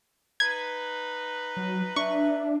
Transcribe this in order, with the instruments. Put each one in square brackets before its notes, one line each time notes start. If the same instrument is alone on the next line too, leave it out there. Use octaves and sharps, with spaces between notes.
[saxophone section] D#4 B4 [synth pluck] G#6
[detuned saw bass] F#3
[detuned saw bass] D4 [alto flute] E5 [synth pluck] C#6